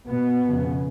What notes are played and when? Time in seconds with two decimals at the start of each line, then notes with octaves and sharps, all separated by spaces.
0.08 B2 B3
0.47 F2 C#3